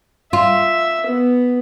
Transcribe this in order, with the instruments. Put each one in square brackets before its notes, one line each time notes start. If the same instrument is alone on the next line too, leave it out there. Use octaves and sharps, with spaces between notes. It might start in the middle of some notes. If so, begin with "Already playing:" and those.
[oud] F4 [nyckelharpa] E5
[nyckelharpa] B3